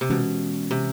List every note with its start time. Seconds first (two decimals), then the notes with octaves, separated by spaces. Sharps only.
0.01 C3
0.10 B2 E3 G#3 C#4
0.71 C3